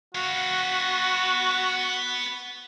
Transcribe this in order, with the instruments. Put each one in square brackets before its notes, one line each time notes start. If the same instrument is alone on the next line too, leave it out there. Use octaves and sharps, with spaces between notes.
[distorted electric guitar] B3 F5 [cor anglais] F#4